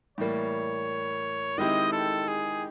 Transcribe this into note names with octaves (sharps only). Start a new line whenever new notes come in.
A2 E3 G3 A#3 C#5
D#3 G#3 C4 E4 G4 D#5
A4
G#4